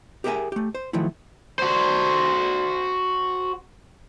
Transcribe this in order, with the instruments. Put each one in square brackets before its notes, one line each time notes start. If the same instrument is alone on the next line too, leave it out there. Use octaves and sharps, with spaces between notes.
[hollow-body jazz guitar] G4 G#4 A#4 D#5 E5 G#5
A3 G4
C5
D#3 F3 F#3 A3 E4
[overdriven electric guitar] F#4 C5